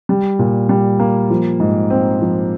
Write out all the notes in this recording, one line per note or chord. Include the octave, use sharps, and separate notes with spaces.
G3
A#2
G3
A#3
F3
G#2
C4
F3